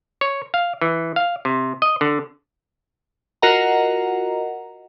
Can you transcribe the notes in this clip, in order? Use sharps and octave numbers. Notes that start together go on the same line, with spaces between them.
C#5
F5
E3
F5
C3
D#5
D3
F4 F#4 A#4 D#5 F#5 A#5